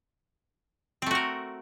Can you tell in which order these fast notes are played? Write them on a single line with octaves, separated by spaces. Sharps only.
C4 A3 F#4 A#4